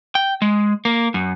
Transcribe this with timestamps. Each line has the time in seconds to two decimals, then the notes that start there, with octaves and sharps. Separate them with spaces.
0.15 G5
0.42 G#3
0.85 A#3
1.14 F#2